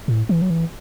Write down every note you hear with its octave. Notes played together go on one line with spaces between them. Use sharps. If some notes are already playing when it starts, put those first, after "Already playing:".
A2
E3
F#3
E3